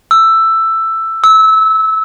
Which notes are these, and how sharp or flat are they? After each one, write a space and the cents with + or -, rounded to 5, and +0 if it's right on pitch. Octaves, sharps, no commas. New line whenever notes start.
E6 +10
E6 -20